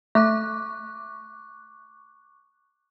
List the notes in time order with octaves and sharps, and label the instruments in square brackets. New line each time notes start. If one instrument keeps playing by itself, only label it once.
[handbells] A3 [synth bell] C#6 D6 F#6